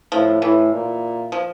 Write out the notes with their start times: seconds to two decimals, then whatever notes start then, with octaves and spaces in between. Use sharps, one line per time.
0.12 A2 F3
0.42 A2 E3
0.72 A#2
1.32 F3